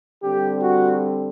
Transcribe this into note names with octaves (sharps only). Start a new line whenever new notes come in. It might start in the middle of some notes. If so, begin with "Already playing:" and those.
D3 G3 C4 G4
F#4